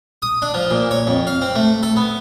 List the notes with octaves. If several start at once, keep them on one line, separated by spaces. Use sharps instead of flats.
D#6
D4
F3
A#2
C#5
F2
F5
C4
A3
A4
B3